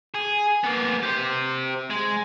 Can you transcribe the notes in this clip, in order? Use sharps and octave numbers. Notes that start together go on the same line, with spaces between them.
G#4
A#3 B3
G4 C5
G#3